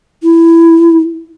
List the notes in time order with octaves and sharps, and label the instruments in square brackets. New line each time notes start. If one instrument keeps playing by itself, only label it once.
[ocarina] E4